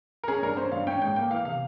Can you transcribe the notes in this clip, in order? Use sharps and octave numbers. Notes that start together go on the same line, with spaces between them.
A#4
C#4 G#4
G2 A#4
C#4 C5
G2 F5
C#4 G5
G#2 G5
A#3 G5
E3 F5
C3 F5